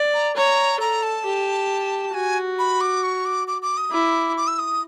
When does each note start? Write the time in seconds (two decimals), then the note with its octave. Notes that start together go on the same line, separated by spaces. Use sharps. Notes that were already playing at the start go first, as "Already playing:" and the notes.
Already playing: D5
0.14 A#5
0.36 C#5 A#5
0.80 A4 A#5
1.03 A5
1.25 G4
2.14 F#4 G#5
2.59 B5
2.81 D6
3.03 C#6
3.25 D6
3.47 D6
3.62 D6
3.77 D#6
3.92 E4 D6
4.37 D6
4.47 E6
4.59 D#6